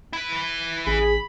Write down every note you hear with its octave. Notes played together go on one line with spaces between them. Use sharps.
E4 B4
A1 G#4 B5